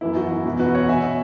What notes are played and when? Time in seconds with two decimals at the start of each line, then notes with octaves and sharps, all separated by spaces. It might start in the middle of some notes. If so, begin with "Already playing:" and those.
0.01 F#2 E3 B3 E4
0.16 F#4
0.31 E4
0.45 E2 B2 F#3
0.59 F#4 B4
0.75 C#5 F#5
0.88 B2 B3 E5 G#5